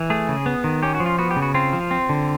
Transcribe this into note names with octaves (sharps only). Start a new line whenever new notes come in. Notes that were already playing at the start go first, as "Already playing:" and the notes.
Already playing: E3
A3 G#4
C#3
B3
D#3
C#4 G4
F#4
F3
F4
B3 F#4
G4
C#3
F#4
C4 F4
F3
C4
D3